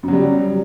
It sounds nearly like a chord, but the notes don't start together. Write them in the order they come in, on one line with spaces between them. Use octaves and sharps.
F#2 F#3 G3